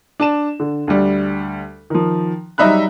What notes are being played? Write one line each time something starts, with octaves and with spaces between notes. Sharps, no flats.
D4 A5 E7
D3
D2 G3
D#3 F3
F#3 G3 D#4 E5 B5 F#6